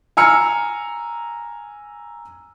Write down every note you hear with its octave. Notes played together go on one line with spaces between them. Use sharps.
G#5 A#5 E6 F6 C#7